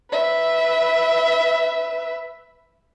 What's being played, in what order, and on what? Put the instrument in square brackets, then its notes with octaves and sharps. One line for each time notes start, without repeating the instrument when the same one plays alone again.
[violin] B4 E5